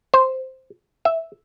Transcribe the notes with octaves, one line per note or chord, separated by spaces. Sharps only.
C5
E5